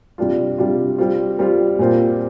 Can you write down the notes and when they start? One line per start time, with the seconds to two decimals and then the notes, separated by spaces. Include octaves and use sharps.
0.18 C3 G3 D4 F4
0.58 C3 G3 D4 F4
0.98 G3 C4 F4
1.39 G3 C4 F4
1.79 A#2 G3 C4 F4